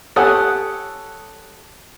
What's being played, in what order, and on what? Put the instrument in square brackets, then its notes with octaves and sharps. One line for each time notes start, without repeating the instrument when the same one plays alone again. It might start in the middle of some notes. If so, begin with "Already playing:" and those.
[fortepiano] G4 A4 C#5 F#5 G#5 D#6